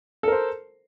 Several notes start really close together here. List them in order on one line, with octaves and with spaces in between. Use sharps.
A4 A#4 C5